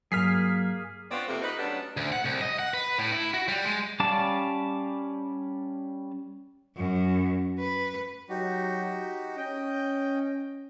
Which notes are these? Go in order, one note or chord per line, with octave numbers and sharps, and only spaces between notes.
G2 F#3 A#3 G#4 F6 B6 C7
B3 C4 F4 C#5 D5 F#5
F2 C3 A#3
D#4 B4
F#3 G3 A3 B3 C#4 D4
D2
F#5
C2
D#5
F#5
B4
A2
E4
F#4
G3
G#3
G3 C#4 D5 F5 A5
F#2
B4
F#3 D#4 F#4 G4
C#4 D#5 G5